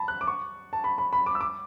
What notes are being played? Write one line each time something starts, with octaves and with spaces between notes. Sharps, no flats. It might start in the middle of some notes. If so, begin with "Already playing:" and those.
Already playing: A5 B5
F#6
D6
C#6
A5
B5
B5
B5
D6
E6
D6